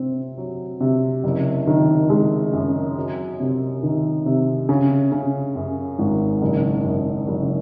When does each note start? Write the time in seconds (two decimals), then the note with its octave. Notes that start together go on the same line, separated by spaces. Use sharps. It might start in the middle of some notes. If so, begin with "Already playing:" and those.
Already playing: C3 C4
0.38 F#3
0.80 C3
1.24 F#1
1.67 D#3
2.10 G#3
2.53 F#2
2.97 F#3
3.40 C3
3.83 D#3
4.26 C3
4.69 C#3
5.12 C#3
5.56 F#2
5.99 G#1
6.42 F#1
6.84 F#2
7.27 F#1